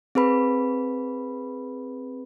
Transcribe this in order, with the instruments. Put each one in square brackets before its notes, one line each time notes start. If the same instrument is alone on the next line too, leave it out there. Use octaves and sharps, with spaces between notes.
[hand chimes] C4 G#4 B4 B5